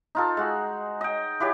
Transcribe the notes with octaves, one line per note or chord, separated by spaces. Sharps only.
D#4 F4 A4
G#3 F#4
D#5 G5
E3 F#4 G4 C#5